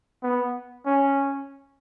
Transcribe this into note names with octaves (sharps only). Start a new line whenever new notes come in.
B3
C#4